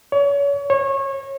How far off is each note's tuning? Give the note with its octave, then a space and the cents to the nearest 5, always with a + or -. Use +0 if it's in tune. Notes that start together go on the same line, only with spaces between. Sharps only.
C#5 +35
C#5 -25